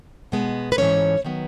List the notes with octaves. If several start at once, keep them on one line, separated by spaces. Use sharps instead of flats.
B2 G#3 B3
B4
G#2 E3 A3 C#4 C#5
D#3 F#3 B3